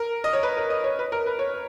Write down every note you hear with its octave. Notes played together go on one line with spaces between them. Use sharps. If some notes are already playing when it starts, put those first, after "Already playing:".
Already playing: A#4
D#5
C#5
B4
A#4
D#5
C#5
B4
A#4
B4
C#5